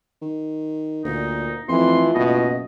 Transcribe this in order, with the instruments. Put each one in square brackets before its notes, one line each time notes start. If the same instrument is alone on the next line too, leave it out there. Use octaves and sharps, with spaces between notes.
[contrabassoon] D#3
[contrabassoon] D2 [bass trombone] A#2 [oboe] D#4
[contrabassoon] F2 [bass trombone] E3 [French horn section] A3 E4 F4 [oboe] C6
[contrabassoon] F#1 [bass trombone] B2 [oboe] D#5